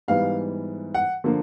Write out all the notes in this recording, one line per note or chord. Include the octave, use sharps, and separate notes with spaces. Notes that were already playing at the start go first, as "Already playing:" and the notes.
G#2 E3 G3 B3 F5
F#5
D3 F3 A#3